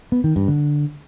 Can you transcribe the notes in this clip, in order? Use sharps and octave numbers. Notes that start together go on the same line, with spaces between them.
B3
D#3
G2
D3